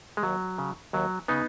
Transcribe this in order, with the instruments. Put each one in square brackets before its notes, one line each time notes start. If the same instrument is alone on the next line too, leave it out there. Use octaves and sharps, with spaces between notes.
[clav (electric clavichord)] G#3
D#2 F#3
C#3
D#2 F#3
C#3 B3 D#4